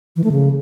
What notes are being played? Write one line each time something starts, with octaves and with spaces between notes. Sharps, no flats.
E3
A3
C#3